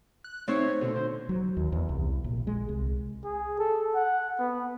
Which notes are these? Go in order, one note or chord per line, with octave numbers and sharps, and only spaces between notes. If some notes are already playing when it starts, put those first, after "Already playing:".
F#6
A3 C4 D#4 C5 C#5
B2 D3
C5
F#3
D#2
E2
C2
A#1
G#3
C2
G#4
A4
F#5
B3